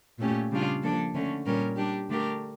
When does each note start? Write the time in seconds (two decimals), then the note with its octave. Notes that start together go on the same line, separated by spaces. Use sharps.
0.19 A#2 A3 C#4 G4
0.51 C#3 G3 D4 F4
0.82 F3 A#3 D4 A4
1.14 D3 A3 C#4
1.46 A#2 G3 C#4 G4 A#4
1.77 G3 D4 G4
2.09 D3 A3 D4 G4 A#4